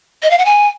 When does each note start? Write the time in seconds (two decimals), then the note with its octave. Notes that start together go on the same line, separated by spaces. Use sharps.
0.23 D#5
0.31 F5
0.38 F#5
0.45 G#5